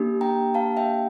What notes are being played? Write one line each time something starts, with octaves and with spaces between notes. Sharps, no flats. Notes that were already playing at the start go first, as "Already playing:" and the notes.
Already playing: A#3 D4 G4
G5 A#5
F5 A5
E5 G5